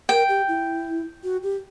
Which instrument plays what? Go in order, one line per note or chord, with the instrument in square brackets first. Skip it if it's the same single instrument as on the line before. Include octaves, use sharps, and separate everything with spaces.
[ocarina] A#4 [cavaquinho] G5
[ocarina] G4
E4
F#4
G4